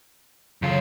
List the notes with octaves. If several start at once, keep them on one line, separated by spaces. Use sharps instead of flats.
F#2 C#3 F4